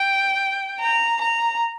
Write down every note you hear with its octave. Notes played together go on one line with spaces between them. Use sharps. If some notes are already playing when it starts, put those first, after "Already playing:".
Already playing: G5
A#5
A#5